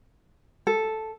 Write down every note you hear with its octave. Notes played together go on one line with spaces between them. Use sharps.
A4